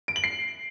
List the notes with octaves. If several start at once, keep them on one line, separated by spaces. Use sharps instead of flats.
D7
F#7
C7